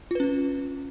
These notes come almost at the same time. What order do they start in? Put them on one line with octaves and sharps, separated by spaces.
F4 B4 C#4